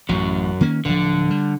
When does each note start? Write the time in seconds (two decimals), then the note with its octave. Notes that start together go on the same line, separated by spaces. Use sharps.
0.09 A1 F#2 F#3
0.61 D#3 A#3 C#4
0.85 D1 D3 F3
1.30 G3